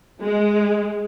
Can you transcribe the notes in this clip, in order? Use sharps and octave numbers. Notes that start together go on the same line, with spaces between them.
G#3